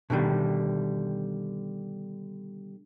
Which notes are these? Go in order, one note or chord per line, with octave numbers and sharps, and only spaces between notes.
B2 D3 D#3 G3